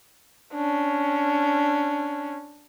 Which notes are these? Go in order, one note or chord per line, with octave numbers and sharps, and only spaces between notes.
C#4 D4